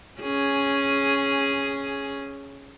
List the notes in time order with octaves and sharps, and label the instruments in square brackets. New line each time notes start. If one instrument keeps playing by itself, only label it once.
[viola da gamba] C#4 G#4